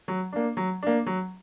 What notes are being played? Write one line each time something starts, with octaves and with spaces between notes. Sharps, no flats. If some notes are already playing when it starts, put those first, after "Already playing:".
F#3
A#3 D4
F#3
A#3 D4
F#3